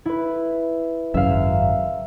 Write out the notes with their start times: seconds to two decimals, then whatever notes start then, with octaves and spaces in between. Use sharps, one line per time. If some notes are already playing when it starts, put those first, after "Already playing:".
0.06 E4 B4
1.14 G#1 F#2 C#3 E5 F5